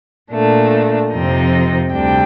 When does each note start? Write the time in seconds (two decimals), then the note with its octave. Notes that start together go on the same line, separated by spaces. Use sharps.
0.31 A#2 A3 D4
1.11 F2 C3 F3 C4 D#4
1.93 D2 C3 G3 D4 G5